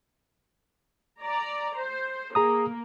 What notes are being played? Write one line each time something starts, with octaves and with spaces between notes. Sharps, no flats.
D5 A#5
C5
A#3 G#4 A#5 D#6